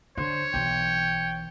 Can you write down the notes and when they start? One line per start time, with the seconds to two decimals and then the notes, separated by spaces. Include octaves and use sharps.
0.17 D3 C5 C#5
0.54 B1 E3 G5